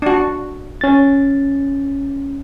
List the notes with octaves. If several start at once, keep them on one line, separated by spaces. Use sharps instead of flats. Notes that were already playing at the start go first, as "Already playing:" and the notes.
D4 F#4
C#4 A6